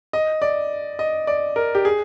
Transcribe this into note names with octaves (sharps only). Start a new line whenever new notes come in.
D#5
D5
D#5
D5
A#4
G4
G#4